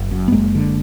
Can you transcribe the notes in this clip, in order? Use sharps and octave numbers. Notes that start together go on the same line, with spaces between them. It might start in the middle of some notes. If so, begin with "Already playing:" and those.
Already playing: F#1
F#2
B3
F#1 G#3 A#3
D3